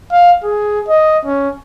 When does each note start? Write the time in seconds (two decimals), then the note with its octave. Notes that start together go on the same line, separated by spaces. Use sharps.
0.12 F5
0.43 G#4
0.88 D#5
1.25 C#4